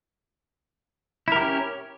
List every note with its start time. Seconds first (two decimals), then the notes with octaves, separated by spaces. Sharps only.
1.28 E4
1.32 A#4
1.36 G4
1.40 C#4